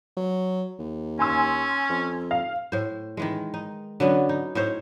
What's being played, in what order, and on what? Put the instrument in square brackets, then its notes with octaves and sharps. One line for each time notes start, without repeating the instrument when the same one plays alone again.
[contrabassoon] F#3
D#2
[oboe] C#4 [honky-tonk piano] G#5 C6 E6
[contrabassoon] F2
[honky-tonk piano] F5
[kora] A2 C5
D#3 E3 G#3
D#4
D3 F#3 B3 C#4
D#4
A2 D#4 C5 C#5